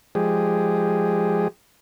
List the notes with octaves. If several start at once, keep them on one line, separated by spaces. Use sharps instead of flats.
F3 G#3 G4 G#4